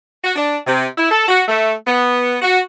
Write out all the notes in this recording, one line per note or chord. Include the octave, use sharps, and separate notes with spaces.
F#4
D4
C3
E4
A4
F#4
A3
B3
F#4